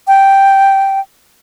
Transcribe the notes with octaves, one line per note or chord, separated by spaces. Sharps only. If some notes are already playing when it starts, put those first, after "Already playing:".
G5